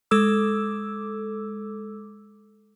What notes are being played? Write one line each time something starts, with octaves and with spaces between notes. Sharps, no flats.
G#3 A4 D6 E6